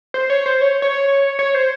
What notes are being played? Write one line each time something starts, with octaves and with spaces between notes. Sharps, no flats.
C5
C#5
C5
C#5
C#5
C#5
C5